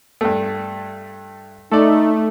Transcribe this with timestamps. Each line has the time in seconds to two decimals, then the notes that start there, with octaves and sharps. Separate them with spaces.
0.21 G2 A3
1.71 A3 D#4 A4 D5